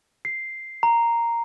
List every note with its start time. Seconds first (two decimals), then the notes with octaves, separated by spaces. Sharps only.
0.25 C7
0.83 A#5